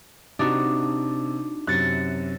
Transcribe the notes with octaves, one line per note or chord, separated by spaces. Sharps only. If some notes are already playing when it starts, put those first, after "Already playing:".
C3 D4 D#4 F#4
F#2 C3 F#6 A6 C#7